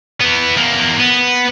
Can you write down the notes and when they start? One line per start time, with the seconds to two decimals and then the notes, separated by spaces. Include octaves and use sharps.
0.20 E3 B3
0.56 E2 A#3
0.99 B3